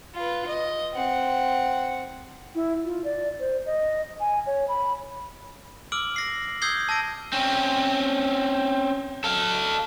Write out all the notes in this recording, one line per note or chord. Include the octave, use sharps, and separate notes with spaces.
F4 B4
D#5
C4 F#5
E4
F4
D5
C5
D#5
G#5
C#5
B5
D6 E6 F6 D7 F#7
A#6 C7
D#6 E6 G6 G#6 C7 G7
A5 E6 A#6 D7
C4 C#4
A4 F5